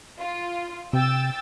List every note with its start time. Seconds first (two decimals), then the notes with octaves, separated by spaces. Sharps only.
0.21 F4
0.93 C3 G5 E6 A6